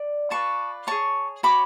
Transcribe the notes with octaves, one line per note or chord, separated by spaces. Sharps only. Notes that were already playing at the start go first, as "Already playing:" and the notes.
Already playing: D5
F4 B4 D5 A5 C#6
G#4 C#5 A5 C#6
F#4 C#5 B5 D6